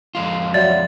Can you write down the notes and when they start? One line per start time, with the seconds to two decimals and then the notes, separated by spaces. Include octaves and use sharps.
0.15 F2 G#3 F4
0.54 F#3 D5 E5 A6